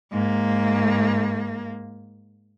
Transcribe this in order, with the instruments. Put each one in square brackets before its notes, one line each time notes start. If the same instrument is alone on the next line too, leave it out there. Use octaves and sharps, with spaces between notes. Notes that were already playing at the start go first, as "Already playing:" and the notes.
[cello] G#2 A#3